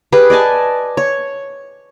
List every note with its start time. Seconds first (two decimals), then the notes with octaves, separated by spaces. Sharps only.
0.12 G4 G#4 B4
0.30 D5 D#5 G#5 A5
0.97 C#5